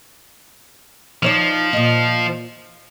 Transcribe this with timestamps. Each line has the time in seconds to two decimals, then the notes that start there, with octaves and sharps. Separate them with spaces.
1.23 F3 D#4 C#5 D5
1.73 A#2 D#5